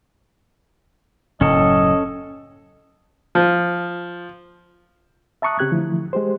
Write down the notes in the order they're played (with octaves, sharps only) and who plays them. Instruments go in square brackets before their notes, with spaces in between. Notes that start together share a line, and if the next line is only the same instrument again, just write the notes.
[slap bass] F#1 A2 F#3 [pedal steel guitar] C#4 A4 [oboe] D#5
[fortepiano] F3
[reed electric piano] E5 A5 A#5 C#6 D#6 F#6
C#3 C4 G4 F#6 G#6
D3 E3 F3 A3 E4
G#3 G4 C5